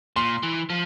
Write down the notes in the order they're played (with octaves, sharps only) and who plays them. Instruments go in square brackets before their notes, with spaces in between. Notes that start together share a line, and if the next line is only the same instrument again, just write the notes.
[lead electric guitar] A#2 [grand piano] C6
[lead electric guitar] E3
F3